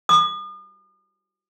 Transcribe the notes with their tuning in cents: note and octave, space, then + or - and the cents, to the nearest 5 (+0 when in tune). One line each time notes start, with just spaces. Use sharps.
D#6 -45